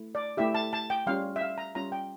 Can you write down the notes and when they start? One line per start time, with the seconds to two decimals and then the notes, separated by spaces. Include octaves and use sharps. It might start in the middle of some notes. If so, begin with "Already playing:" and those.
Already playing: A3 E4
0.15 D5
0.37 A3 E4 G4 E5
0.55 A5
0.73 A5
0.90 G5
1.07 G3 C#4 F4 F5
1.36 E5
1.41 F5
1.58 A#5
1.75 G3 C#4 F4 A#5
1.92 G5